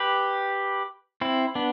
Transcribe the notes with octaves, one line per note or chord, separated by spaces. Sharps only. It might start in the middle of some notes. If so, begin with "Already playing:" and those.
Already playing: G4 B4
C4 E4
B3 D4